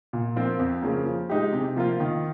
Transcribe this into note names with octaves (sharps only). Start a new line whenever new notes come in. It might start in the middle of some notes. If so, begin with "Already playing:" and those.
A#2
F3 C4 F4 A#4
F2
C#3 F3 A#3
F3
G#3 D#4 G4
C3
F3 A#3 F4
D#3